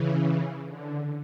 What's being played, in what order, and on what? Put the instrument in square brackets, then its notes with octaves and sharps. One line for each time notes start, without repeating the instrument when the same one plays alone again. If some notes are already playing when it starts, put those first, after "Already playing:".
Already playing: [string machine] C#3 E3
D3